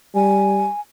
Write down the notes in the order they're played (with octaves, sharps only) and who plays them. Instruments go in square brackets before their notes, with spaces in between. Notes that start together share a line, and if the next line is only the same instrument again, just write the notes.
[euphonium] G3 [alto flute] G#5